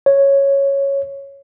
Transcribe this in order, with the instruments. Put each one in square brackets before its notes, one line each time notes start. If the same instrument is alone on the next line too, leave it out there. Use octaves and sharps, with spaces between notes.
[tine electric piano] C#5